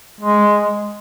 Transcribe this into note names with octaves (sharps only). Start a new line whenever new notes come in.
G#3